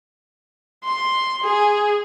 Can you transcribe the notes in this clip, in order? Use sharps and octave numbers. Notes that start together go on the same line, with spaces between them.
C6
G#4